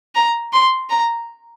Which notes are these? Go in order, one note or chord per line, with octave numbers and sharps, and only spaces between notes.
A#5
C6
A#5